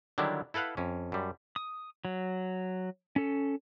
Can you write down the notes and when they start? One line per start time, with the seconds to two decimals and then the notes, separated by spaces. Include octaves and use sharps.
0.18 D3 D#3 F#3 G3 D4 E4
0.54 E4 A4 B4 F5 F#5
0.77 F2 C#4
1.12 F#2 G3
1.56 D#6
2.05 F#3
3.16 C#4 A4